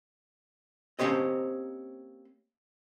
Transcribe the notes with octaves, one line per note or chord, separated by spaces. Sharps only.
A#3 C4 C#4 G4 C5 D#5